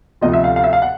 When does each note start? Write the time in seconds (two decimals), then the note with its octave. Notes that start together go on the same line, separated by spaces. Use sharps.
0.21 D2 C3 F3 D#5
0.34 E5
0.44 F5
0.56 F5
0.64 E5
0.73 F5
0.82 F#5